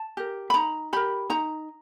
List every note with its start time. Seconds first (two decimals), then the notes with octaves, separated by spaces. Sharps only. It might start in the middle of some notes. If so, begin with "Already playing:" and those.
Already playing: A5
0.17 G4 A#4
0.50 B5
0.54 D#4 A#5
0.93 G4 A#4 B5
1.30 D#4 A#5